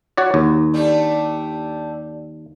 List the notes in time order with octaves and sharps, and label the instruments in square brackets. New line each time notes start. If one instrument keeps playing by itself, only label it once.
[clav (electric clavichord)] F#4 C#5 D5
D#2
[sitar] G3 A3 D4